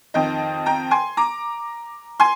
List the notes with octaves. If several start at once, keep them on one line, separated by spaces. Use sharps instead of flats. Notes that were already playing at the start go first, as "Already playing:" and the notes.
F2 D#3 D#5 G5
G5 A#5
G#5 C6
A#5 D6
G#5 C6